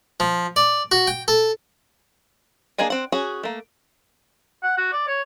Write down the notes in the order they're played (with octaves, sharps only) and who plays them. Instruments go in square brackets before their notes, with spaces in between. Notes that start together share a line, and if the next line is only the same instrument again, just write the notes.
[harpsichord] F3
D5
F#4
G5
A4
[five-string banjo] A#3 D4 G#4 D#5 G#5
C4 F#5
C#4 F#4 G#4
A3 A#3
[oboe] F#5
F#4
D5
C#5